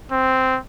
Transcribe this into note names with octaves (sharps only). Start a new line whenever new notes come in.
C4